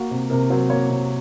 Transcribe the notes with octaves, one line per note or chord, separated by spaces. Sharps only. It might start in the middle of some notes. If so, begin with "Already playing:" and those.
Already playing: A#3 F#4
C3
C3 A#4
F#3 C5
A#3 C#5
C3